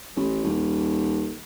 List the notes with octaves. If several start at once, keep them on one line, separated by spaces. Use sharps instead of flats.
A1
D#1